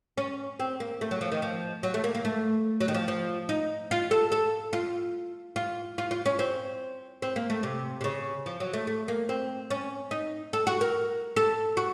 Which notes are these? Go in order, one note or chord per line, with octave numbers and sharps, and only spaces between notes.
C#4
C4
A#3
A3
F#3
F3
D#3
F3
F#3
A3
A#3
A#3
A3
F#3
D#3
F3
F3
D#4
F4
A4
A4
F4
F4
F4
F4
C#4
C4
C4
A#3
A3
C3
C3
C#3
F3
F#3
A3
A3
A#3
C4
C#4
D#4
A4
F#4
A#4
A4
F#4